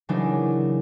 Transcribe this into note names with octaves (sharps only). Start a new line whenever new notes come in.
C#3 E3 F#3 A#3 D4 D#4